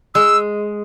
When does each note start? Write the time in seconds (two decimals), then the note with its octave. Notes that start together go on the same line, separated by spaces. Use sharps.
0.15 G#3 E6